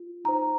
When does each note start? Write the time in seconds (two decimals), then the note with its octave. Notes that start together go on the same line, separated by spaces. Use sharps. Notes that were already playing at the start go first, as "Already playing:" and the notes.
Already playing: F4
0.25 D#4 C5 A#5